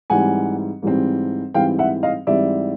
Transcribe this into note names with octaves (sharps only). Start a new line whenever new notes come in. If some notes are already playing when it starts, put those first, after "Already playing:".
G#2 E3 G3 C4 F#5 G#5
G#2 E3 G3 C4
G#2 E3 G3 C4 F5 G5
E5 F#5
D#5 F5
G#2 E3 G3 C4 D5 E5